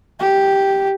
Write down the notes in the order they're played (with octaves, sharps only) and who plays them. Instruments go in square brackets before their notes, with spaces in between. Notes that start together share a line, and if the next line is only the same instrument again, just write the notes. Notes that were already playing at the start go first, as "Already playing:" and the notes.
[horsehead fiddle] G4